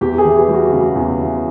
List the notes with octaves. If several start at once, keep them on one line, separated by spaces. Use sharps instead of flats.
E2 G4
G#4
E3
G4
G3
F#4
C#3 F#4
E2
E3